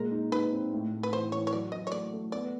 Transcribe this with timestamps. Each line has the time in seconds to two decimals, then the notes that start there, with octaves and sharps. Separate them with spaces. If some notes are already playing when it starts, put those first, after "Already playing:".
Already playing: A#2 G#3 A#4
0.12 D#4
0.32 D#4 B4
0.52 C4
0.73 A2
0.92 A2
1.03 B4
1.12 E3 C5
1.32 E3 C#5
1.47 C#5
1.52 F#3 D5
1.72 F#3 D#5
1.87 C#5
1.92 A3 D5
2.13 A3
2.32 B3 D5